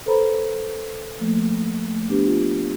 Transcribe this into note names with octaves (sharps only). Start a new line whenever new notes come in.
A4 B4 C5 A#5 B5
F3 A3 A#3
A3
B3 D4 G4 B4
F4